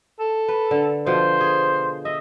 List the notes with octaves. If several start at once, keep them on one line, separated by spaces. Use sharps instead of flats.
A4
B4
D3
B2 F3 C5
G#4
D#5 E5